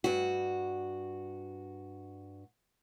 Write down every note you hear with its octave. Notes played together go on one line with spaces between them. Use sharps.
G2 F#4